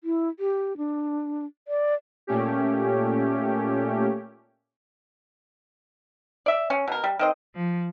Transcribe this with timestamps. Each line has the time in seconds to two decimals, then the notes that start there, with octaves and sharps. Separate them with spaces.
0.04 E4
0.40 G4
0.77 D4
1.68 D5
2.27 A#2 A3 C#4 G4
6.46 D5 E5
6.70 C#4
6.88 B2 A#4
7.04 G3
7.19 D#3 C4 D#5
7.55 F3